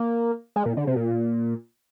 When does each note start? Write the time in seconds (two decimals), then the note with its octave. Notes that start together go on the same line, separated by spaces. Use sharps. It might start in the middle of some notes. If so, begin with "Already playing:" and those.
Already playing: A#3
0.56 G#3
0.66 A#2
0.77 D3
0.87 C3
0.96 A#2